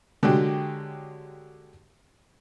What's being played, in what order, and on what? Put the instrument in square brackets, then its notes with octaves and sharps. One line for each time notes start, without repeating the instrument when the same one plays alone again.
[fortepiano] D3 F#3 G#3 G4